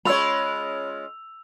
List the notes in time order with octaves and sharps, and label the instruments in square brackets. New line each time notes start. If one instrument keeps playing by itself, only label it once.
[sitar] G#3 C#4 F4 [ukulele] C#5 B5 [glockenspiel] E6 F7